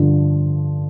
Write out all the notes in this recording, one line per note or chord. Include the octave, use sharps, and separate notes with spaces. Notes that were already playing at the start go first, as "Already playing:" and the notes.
Already playing: G2 D3 F3